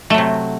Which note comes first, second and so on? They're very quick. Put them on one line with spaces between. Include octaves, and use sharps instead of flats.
A3 F#3 C3